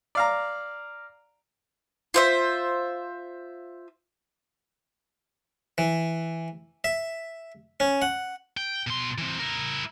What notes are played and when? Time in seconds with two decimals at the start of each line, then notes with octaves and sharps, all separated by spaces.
0.15 D5 F5 A#5
2.14 F4 C5 E5
5.78 E3
6.84 E5
7.80 C#4
8.02 F#5
8.57 G5
8.87 B2 C6
9.18 E3 C4
9.39 E4 A#4